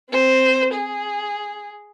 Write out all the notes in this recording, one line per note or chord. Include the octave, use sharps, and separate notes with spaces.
C4 C5
G#4